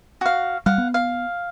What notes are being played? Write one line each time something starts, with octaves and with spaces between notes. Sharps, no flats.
F#4 F5
G3 F5 F#5
B3
F5